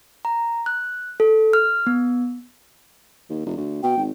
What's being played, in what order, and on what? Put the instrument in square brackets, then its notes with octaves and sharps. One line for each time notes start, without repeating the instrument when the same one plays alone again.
[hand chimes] A#5
F#6
A4
F6
B3
[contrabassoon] D#2
F1
D2
[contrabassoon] B2 [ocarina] G5
[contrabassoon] G#1